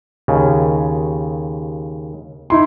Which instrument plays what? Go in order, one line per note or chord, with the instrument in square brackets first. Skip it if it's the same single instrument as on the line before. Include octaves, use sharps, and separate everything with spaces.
[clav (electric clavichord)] D#2 C#3
[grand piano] D#4 E4 C6